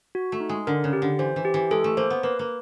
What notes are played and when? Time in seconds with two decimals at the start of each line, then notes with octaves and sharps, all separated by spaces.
0.15 F#4
0.32 A3
0.40 D#4
0.49 G#3
0.67 D3 A#4
0.84 C#3
0.93 G4
1.02 D3
1.19 E3 C5
1.36 E3
1.45 G4
1.54 E3
1.71 G#3 A4
1.84 A3
1.97 A#3 C5
2.10 B3
2.23 A#3 B4
2.39 A#3